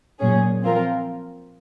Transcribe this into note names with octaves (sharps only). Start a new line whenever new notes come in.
A#2 F#3 C#4 G#4
F3 C4 F4 A#4